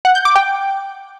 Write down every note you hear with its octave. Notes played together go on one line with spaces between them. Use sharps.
F#5
G6
D6
G5